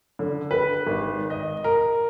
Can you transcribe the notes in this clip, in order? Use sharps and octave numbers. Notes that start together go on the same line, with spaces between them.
D3
B4
G#1
D#5
A#4